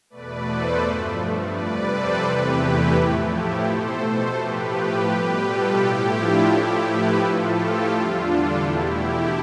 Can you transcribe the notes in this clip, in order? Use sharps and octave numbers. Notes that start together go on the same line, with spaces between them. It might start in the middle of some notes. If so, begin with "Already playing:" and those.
E2 B2 A3 B4 D5
A4 C5
G2 F3 A3
F2 C3 G3 B4 D5
A4 C5
E2 C3 E3 A3 G4 B4
E4 G4
A2 F3 A3
E4 G4
B2 A3 A4 C5
A4 C5
A2 F3 A3 G4 B4
B2 G3 G4 B4
F4 A4
A2 F3 A3 E4 G4
D4 F4
A2 F3 A3 E4 G4
G4 B4
A2 F3 A3 F4 A4
E4 G4
E2 D3 G3 D4 F4
F4 A4
E2 B2 A3 E4 G4